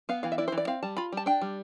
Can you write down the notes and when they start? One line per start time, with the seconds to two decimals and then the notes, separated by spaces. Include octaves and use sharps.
0.09 B3 F5
0.23 E3 F5
0.32 E5
0.38 E4 D5
0.48 C5
0.52 E3
0.58 D5
0.67 C4 F5
0.83 G3 A5
0.97 F4 B5
1.12 G3 A5
1.26 D4 G5
1.41 G3